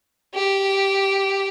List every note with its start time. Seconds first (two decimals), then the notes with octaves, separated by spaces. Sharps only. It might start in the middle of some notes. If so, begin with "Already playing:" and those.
0.34 G4